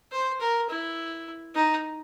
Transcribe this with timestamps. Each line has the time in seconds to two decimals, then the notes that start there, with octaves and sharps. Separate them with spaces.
0.12 C5
0.40 A#4
0.69 E4
1.55 D#4